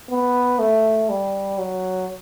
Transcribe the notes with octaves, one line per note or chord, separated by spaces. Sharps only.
B3
A3
G3
F#3